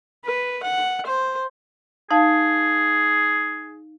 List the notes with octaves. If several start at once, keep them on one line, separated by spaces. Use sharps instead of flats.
B4
F#5
C5
D#4 G#4 F5 A5